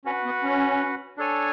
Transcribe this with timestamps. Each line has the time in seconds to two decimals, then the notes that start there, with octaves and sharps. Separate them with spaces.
0.05 C#4 F#4 B4 F#5
0.25 B3
0.43 C#4
1.17 D4 A4 C#5 G#5